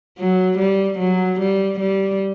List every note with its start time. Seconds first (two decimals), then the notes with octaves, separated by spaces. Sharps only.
0.18 F#3
0.59 G3
0.99 F#3
1.40 G3
1.80 G3